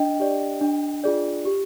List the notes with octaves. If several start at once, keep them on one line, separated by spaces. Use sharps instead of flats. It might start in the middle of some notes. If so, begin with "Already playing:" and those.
Already playing: D4 D#5 G5
G4 D5
D4
F4 G#4 D5
G4